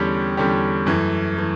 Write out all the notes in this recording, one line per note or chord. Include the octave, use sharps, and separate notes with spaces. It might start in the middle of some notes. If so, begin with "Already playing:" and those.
Already playing: E2 D3 G3 C#4 G4
E2 D3 G3 C#4 G4
F#2 E3 A3
E3 A3